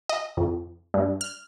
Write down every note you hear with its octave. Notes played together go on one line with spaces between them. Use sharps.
D#5
F2
G2
F6